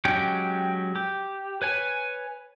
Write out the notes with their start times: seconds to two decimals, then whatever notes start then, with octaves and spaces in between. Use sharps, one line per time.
0.05 F#3 G#3 C#4 G4 G5
0.96 G4
1.62 B4 C#5 G#5